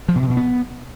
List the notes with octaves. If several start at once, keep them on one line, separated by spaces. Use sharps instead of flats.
F3
B2
C3
B2
B3